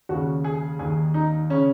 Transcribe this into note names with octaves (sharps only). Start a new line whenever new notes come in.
D#2 C#3 F#4
G#4
D#2 D#3 G#4
D#4
C#3 C#4